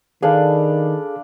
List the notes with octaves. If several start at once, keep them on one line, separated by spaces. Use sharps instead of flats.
D#3 D4 G#4 A4 F5 B5